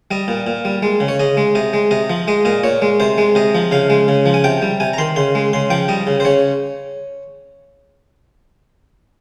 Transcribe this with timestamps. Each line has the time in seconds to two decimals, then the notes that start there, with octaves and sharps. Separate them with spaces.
0.11 G3 D#5
0.28 A#2
0.47 A#2
0.65 G3
0.83 G#3
1.00 C#3
1.08 C#5
1.20 C#3 D#5
1.37 G#3
1.55 C3 D#5
1.73 G#3
1.91 C3 D#5
2.10 F3
2.28 G#3 D#5
2.45 A#2 D#5
2.63 A#2 C#5
2.82 G#3
3.00 C3 C5
3.18 G#3
3.35 C3 D#5
3.54 F3
3.71 C#3 F5
3.90 G#3
4.08 C#3
4.26 F3
4.34 G#5
4.44 C3 G5
4.62 G3
4.80 C3 G#5
4.93 A#5
4.98 D#3 C6
5.16 C#3 C6
5.35 G#3
5.53 C#3 C6
5.70 F3 G5
5.88 G3 D#5
6.07 C#3
6.20 C5
6.25 C#3 C#5